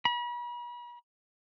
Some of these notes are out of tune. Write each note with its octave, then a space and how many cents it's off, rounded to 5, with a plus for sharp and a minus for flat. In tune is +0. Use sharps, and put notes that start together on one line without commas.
B5 -40